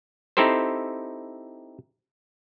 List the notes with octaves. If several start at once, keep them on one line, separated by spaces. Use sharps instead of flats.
C4 D#4 E4 G4 A4 C5